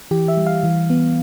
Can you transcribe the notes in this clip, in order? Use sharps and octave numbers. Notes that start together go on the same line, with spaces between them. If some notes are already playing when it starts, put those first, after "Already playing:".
E3 G4
E5
G3
F5
E3
B3